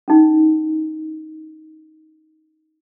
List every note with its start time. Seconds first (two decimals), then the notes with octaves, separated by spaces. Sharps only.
0.08 C#4 D#4